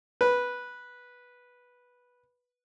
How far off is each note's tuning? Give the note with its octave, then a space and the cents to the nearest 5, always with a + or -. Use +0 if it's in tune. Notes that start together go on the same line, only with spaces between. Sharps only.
B4 -10